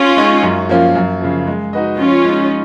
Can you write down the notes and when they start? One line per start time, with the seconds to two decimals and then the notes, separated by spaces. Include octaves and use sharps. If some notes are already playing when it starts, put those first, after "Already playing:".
Already playing: C#4 F4
0.17 G#3 D#4 G#4
0.43 F#2
0.69 F3 A#3 C#4 F4
0.95 F#2
1.21 C#3 F3
1.47 G#3
1.73 D#4 F#4 B4 D#5
1.99 F3 C#4 F4
2.25 G#3 D#4